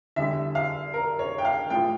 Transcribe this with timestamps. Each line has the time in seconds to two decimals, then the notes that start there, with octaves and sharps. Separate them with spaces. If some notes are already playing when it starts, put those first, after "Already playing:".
0.16 E2 D3 G3 E5
0.55 F5
0.94 A#4
1.19 C#5
1.38 G5
1.45 F5
1.70 A1 A2 F3 G5